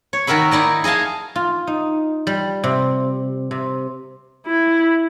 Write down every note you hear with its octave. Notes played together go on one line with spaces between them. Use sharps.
C#5
D#3 F#4 A#4 E5 B5
D#4 E4 D5 D#5
G#4 D#5 F5 G#5 A5
F4
D#4
G3
C3
C3
E4